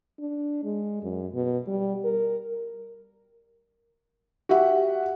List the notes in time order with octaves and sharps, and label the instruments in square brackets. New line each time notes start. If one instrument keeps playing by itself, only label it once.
[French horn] D4
G#3
F#2
B2
G3
A#4
[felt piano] F#4 G4 E5 F#5